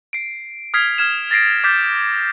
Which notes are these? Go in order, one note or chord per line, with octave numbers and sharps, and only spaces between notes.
C7 D7
D#6 F6 G#6 B6 C7
F6 G#6 E7
A6 A#6 C7 D7
D6 F6 G6 A6 B6